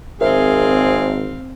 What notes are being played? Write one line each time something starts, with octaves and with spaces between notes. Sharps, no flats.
G#1 C4 G#4 A#4 C5 E5 F5